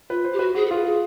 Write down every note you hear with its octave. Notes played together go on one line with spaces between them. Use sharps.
F4 B4
C5
G4
F#4 B4
F#4 G#4
A4
F4 G#4
G#4